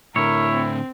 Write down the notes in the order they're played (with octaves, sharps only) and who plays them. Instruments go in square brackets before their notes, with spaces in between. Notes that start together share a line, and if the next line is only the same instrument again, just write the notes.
[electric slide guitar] A2 D3 [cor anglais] E4 [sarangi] A#4 [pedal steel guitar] C#5
[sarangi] C4